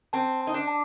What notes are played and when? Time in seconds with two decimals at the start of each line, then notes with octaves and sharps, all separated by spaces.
0.13 C4 A5
0.41 A5
0.47 D#4
0.54 D4
0.67 A5